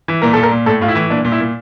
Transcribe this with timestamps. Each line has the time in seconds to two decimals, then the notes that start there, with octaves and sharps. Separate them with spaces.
0.08 E3
0.22 A#2 A#4
0.33 A#2 A4
0.43 A#4
0.51 A#2
0.66 A2 A4
0.81 A2 F4
0.88 E4
0.95 E3
1.10 A#2 D4
1.25 A#2
1.32 E4
1.40 A#2